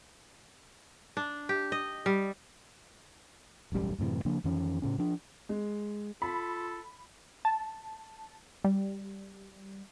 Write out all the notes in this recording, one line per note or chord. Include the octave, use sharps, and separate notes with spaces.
D4
G4
D#5
G3
E1 A1 F#2 G3
F#2 A2 C3 E3
C#3 F3 A#3 D4
F2 D#3 E3 C#4
A2 C#3 C#4
F3 D4
G#3
F4 A4 B5
A5
G3